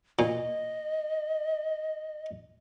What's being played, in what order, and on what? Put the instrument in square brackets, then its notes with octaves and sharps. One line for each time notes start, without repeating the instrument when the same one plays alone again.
[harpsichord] A#2 [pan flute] D#5